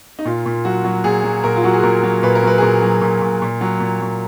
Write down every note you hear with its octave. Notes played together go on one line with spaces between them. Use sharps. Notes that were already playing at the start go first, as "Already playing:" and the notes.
D#4
A#2 F4
A#2
F#3 F#4
F#3
A#2 G#4
F#3
A#2 A#4
F4
F#3 F#4
G#4
A#2 A#4
F#3
A#2 B4
A#4
F#3 B4
G#4
A#2 A#4
F#3
A#2
A#2
A#2
F#3
A#2
F#3